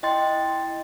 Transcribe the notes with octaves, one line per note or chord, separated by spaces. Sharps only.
E4 D#5 G5 C6 A6